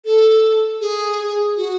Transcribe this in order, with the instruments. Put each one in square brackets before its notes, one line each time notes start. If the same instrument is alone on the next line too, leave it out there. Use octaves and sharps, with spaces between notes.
[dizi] A4
G#4
F#4